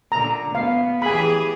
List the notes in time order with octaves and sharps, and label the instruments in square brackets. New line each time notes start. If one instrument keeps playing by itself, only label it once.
[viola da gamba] A#2 D3 [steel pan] A#5
[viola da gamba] B3 [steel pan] F5
[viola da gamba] E3 G4 G#4 [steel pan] G#5 B5